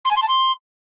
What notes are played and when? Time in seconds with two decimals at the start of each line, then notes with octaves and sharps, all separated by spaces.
0.05 C6
0.10 G#5
0.16 C6
0.22 A5
0.28 C6